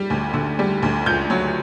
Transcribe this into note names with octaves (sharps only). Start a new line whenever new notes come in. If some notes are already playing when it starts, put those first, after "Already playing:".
Already playing: G3
D2
D3
G3
D2
C#2 G6
F#3